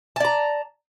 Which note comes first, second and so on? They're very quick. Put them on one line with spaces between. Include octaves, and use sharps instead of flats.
A5 D5 A#5